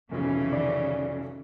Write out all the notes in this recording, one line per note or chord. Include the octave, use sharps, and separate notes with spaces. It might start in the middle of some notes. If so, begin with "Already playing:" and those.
F1 B1 C#3 E3
D#3 D5